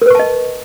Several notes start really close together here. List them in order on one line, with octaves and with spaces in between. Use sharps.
A#4 B4 C#6 A5 D#5